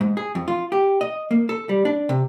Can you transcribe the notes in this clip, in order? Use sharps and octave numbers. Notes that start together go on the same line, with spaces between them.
G#2
G#4
F2
F4
G4
D#5
A#3
A4
G3
D4
C3